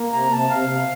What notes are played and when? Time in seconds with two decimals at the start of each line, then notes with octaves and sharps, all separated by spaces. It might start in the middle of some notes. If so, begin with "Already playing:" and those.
Already playing: A#3
0.12 C3 A#5
0.31 C3 A5
0.50 C3 F5
0.69 C3